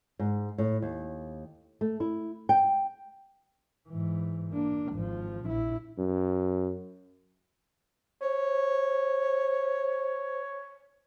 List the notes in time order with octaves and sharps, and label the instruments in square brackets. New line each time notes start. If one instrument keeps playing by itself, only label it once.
[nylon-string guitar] G#2
A2
D#2
A3
E4
G5
[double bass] G#2 E3
A#3 D4
G#1 F3
A#1 E4
[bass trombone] F#2
[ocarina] C5 [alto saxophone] C#5